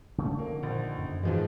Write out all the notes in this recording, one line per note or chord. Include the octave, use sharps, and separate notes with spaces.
C#3 A3 C#4
D3 D#3 F3 A#3
A#1
F#2
G#2 E3 F3 G#3